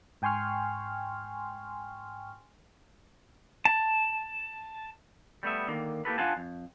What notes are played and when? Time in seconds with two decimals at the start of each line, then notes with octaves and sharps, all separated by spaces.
0.22 G#2 G5 G#5 C6 C#6 F6
3.65 A5
5.43 G3 A3 B3 E5
5.67 D3 D#3 A#3
6.05 A#3 E4 G4 A4 B4
6.18 D4 F4 F5 F#5 G#5 A5
6.37 F2